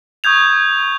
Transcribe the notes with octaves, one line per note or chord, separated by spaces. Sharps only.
C#6 D#6 G6 G#6 F7